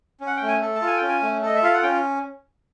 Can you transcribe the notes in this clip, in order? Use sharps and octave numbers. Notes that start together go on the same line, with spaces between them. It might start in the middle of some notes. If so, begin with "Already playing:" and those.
C#4
F#5
A3 G5
G#5
A4
A5
F4
G#5
C#4 G5
G#5
A3
A4 D#5
E5
F4 F5
F#5
C#4 G5